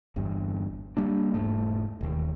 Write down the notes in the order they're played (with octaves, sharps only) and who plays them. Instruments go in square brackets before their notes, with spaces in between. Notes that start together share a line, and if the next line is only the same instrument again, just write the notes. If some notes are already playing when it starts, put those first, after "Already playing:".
[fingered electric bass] G1 E2 G2
G3 A#3 D4
E1 G#2 A3
E1 D#2